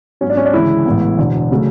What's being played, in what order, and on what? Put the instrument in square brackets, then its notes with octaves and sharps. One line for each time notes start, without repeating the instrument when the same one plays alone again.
[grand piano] G#2 F#3 B3 C#4
D4
C#4
D4
D2 C#3 E3 G#3 E4
A1 A2 G#3 B3
E1 D2 D3
C#3 F#3 A3